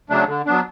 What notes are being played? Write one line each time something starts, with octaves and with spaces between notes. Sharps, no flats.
C#3 F#3 A3 D4
D3
F#3 B3 D4